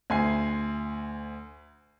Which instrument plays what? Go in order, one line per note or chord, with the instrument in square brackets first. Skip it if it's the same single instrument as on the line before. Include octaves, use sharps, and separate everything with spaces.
[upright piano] D2 G#5 C7